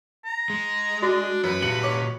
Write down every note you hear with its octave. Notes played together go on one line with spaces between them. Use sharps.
A#5
G#3
D4 F#4 D5
F#2 B4
A#2 G4 C#7 F#7
C#5 D6